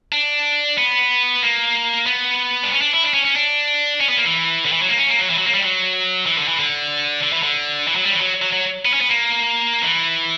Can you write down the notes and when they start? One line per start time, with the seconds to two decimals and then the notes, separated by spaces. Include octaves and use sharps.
0.12 D4
0.78 B3
1.42 A#3
2.06 B3
2.63 D4
2.72 C#4
2.81 D4
2.93 E4
3.04 D4
3.14 C#4
3.25 C#4
3.36 D4
4.01 C#4
4.09 B3
4.17 A#3
4.25 E3
4.65 D3
4.73 E3
4.82 F#3
4.89 A#3
4.98 C#4
5.09 A#3
5.19 F#3
5.30 E3
5.38 F#3
5.45 A#3
5.54 G3
5.62 F#3
6.26 E3
6.38 D3
6.48 E3
6.59 D3
7.23 D3
7.33 E3
7.43 D3
7.88 E3
7.96 F#3
8.05 G3
8.12 E3
8.21 F#3
8.42 F#3
8.52 F#3
8.85 B3
8.93 C#4
9.01 B3
9.09 A#3
9.82 E3